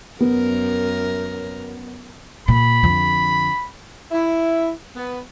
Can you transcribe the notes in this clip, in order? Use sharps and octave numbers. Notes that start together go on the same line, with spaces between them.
F#2 B3 A#4
A#2 B5
F2 D3
E4
B3